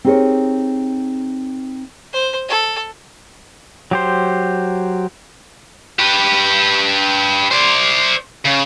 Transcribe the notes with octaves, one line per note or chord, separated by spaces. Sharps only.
C4 D#4 G4 G#4 A#4 C#5
C5
A4
F#3 G4 C5
G4 B4
C5 D5
C#3